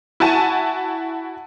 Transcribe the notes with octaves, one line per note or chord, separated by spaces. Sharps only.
E4 F#4 G#5 A5